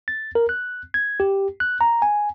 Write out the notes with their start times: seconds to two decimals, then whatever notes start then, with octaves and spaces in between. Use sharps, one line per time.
0.08 A6
0.35 A#4
0.49 F#6
0.94 G#6
1.20 G4
1.60 F#6
1.81 A#5
2.02 G#5